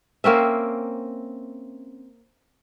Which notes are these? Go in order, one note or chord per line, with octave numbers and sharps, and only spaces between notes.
A#3 C4 C#4 E5